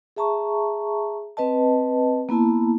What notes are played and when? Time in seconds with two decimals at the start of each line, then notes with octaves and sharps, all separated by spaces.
0.16 G#4 E5 A5 A#5 C#6
1.37 C4 B4 D#5 A5
2.29 A#3 B3 E4 A5